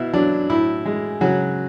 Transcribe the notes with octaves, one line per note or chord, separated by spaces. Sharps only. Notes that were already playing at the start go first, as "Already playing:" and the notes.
Already playing: B2 E4
F#3 D4
A2 E4
G#3
C#3 F#3 F#4